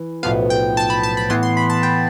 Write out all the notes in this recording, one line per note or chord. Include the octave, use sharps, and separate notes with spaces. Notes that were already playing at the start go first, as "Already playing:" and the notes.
Already playing: E3
B1 A2 F3 B3 F5
G5
A5
B5
A5
B5
A2 E3 B3 C6
C6
B5
A5
G5